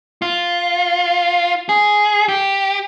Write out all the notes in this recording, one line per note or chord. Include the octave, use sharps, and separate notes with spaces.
F4
G#4
G4